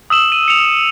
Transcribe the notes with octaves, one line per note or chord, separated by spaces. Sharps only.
D#6 E6 E7 F#7
D#7
C#7 F7